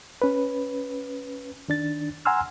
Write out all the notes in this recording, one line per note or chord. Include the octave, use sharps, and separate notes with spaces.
C#4 B4
D#3 D4 A6
F#5 G#5 A#5 C6 E6 F6